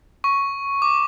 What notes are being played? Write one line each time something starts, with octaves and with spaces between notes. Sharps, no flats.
C#6
D6